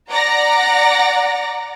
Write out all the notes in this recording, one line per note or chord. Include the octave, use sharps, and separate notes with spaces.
D5 F#5 A#5 A#6